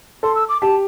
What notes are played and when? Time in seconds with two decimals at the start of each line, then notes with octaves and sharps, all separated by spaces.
0.23 A4 C6
0.35 E6
0.49 D6
0.62 G4 A5